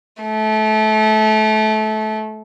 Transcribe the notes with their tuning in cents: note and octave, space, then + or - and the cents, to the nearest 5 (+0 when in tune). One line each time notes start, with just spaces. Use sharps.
A3 -25